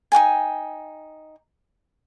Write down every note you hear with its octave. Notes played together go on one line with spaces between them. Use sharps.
D#4 F#4 G5 G#5